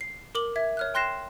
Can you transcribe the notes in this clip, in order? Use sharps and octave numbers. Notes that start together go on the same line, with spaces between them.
C7
A#4 D6 F#7
E5 G#6
C#5 F6 F#6
G5 C6 F#6 A#6 C7 E7